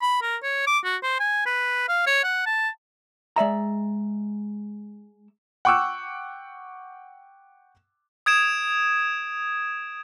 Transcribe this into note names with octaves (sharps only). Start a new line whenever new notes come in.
B5
A#4
C#5
D6
F#4
C5
G#5
B4
F5
C#5
F#5
A5
G#3 D5 E5 A#5
F#5 G5 C#6 D6 E6 F#6
D#6 G#6 D7 E7